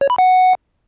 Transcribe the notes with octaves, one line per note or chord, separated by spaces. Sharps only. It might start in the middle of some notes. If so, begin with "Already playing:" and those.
C#5
B5
F#5